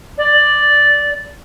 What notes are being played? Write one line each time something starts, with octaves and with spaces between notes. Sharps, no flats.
D5